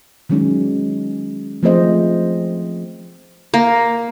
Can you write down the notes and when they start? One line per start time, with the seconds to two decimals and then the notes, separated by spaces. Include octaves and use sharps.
0.29 D#3 F#3 G#3 C#4 D#4
1.63 F3 A3 C4 G#4 C5 D#5
3.54 A#3